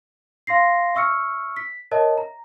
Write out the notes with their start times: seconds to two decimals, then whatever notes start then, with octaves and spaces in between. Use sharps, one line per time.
0.47 F5 C6 A#6 C7
0.95 E5 C#6 E6 F6 C#7
1.56 B6
1.91 A#4 C#5 D#5 E5 A5
2.18 A#5